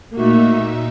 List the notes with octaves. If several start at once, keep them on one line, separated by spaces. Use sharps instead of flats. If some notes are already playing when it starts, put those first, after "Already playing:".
A#2 A3 A#3 D#4 F#4 E5